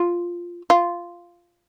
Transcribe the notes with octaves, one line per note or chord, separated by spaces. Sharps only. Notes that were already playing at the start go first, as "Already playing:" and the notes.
Already playing: F4
F4